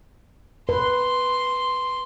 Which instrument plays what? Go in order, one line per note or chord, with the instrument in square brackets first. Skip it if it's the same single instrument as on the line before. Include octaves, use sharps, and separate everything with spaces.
[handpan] B4 [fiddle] C6